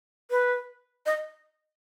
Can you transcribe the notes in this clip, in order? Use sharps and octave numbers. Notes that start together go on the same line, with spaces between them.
B4
D#5